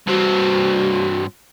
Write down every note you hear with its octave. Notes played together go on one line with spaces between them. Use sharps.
G2 C4 F#4